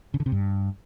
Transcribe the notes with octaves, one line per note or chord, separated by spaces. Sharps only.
C#3
D3
C3
G2